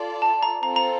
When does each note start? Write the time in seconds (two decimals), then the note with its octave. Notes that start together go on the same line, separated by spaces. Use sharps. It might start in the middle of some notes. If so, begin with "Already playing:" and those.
Already playing: F4 A4 D5
0.22 A5
0.43 A#5
0.62 C4 F4 A4 A#5
0.76 A#5